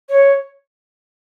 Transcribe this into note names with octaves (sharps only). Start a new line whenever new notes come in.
C#5